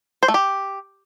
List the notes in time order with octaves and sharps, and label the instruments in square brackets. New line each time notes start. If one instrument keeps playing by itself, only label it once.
[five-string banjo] C5
A3
G4